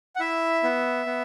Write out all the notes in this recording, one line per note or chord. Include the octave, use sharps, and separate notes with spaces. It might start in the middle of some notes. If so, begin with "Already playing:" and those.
F#5
E4 E5
B3
B3